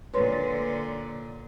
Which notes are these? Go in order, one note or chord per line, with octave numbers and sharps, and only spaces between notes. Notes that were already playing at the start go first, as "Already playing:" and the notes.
A#2 D3 B4 C#5 C6